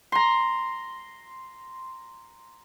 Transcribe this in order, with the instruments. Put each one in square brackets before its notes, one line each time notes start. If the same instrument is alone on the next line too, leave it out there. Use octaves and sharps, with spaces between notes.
[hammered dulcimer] A#5 C6